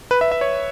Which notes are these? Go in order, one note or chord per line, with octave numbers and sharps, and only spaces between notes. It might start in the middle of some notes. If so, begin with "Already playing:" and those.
B4
E5
E5
C#5